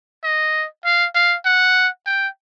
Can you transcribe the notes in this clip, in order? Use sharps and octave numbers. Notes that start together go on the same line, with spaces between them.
D#5
F5
F5
F#5
G5